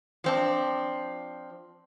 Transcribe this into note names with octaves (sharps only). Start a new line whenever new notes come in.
F3 C4 D4